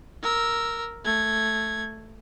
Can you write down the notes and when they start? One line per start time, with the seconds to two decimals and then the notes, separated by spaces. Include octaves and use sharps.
0.22 A#4 E6
1.05 A3 G#6